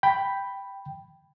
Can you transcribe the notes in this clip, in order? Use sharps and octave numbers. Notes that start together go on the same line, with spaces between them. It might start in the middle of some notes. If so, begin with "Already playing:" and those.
G5 B5